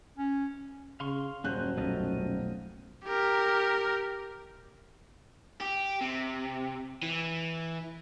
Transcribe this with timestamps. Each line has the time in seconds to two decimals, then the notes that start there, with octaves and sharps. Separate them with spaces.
0.18 C#4
1.00 C#3 F5 C6 C#6
1.44 D#1 F#2 G#3 C#4 C5 F#6 G6
1.77 B1 A3 F4 D#5
3.04 G4 A#4
5.61 G4
6.01 C3
7.03 E3